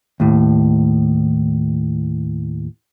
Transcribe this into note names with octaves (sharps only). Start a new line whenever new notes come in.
D#2 A2